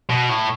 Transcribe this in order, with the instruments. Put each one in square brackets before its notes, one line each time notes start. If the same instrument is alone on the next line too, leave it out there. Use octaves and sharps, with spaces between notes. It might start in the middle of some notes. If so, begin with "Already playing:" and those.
[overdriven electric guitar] B2
A2